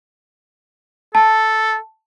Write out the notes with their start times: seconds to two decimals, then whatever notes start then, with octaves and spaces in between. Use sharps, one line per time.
1.15 A4 A5